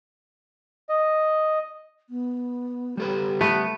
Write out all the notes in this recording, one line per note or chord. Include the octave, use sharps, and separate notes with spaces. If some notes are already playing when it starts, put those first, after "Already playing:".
D#5
B3
G3 G4 A4 B4
A3 B3